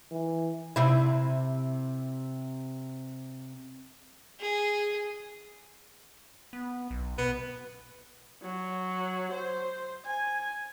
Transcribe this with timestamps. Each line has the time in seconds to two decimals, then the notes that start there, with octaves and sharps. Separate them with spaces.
0.12 E3
0.76 C3 E4
4.40 G#4
6.53 B3
6.90 B1
7.18 B2 B3
8.43 F#3
9.31 C5
10.06 G#5